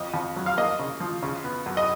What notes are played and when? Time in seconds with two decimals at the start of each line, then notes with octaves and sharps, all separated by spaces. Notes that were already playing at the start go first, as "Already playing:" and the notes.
Already playing: F2 D#5
0.14 F2
0.36 F#3
0.46 F5
0.57 A#3 D#5
0.79 C#3
1.00 F3
1.23 C#3
1.44 B3
1.66 F#2
1.77 D#5